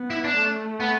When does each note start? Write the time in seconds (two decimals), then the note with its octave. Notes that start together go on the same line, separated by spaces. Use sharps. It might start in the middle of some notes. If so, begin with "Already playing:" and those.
Already playing: B3
0.10 E4
0.24 D4
0.37 A3
0.80 B3